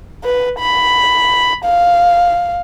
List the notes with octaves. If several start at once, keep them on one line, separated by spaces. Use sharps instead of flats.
B4
B5
F5